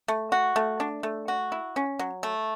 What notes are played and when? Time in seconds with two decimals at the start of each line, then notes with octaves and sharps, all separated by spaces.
0.08 A3
0.32 F#4
0.56 A3
0.80 D4
1.03 A3
1.28 F#4
1.52 E4
1.76 C#4
1.99 F#3
2.23 A3